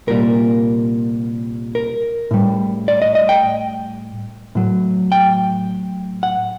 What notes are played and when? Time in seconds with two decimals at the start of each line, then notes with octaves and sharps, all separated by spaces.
0.07 C2 A#2 G3 A#4
1.75 A#4
2.31 A2 G3
2.88 D5
3.02 D#5
3.15 D#5
3.29 G5
4.55 A2 F#3
5.12 G5
6.23 F#5